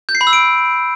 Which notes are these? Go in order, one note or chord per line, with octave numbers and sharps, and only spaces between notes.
G6
C7
B5
E6
D7